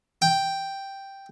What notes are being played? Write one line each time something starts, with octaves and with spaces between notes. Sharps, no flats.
G5